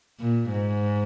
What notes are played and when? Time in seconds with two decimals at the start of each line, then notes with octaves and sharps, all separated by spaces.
0.20 A#2
0.52 G#2